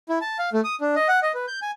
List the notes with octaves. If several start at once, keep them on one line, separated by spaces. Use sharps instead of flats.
E4
A5
F5
A3
D#6
D4
D#5
F#5
D#5
B4
G6
G#5